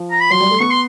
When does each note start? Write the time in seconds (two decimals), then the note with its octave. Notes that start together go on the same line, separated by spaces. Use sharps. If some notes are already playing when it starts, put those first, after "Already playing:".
Already playing: F3
0.11 A#5
0.20 B5
0.30 F#3 C6
0.41 G3
0.51 A3
0.60 B3 C#6
0.70 C6